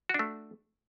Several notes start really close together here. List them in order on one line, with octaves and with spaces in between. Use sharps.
F#4 D4 A3